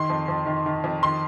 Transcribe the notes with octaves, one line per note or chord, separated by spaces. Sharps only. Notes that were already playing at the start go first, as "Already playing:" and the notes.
Already playing: D#3 C6
F2
F2
D#3
D#3
F2
D#3 C6